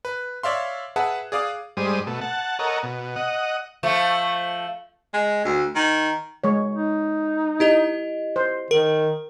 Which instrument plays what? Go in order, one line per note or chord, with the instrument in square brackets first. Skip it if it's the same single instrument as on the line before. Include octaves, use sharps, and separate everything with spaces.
[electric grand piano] B4
C#5 D5 E5 F5 C6
G#4 B4 E5 F#5 A5 F#6
G#4 D5 F5 D6 D#6
[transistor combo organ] G2 G3 G#3 C5 D#6
B2 A3
F#5 A5
A4 A#4 C#5 D#5 F#5
B2
D#5 F#5
[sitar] F3 A3
[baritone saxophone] G#3
D2
D#3
[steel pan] G#3 C#5
[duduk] D#4
[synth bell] E4 G4 D#5
[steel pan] C5
[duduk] D#3 [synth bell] A#4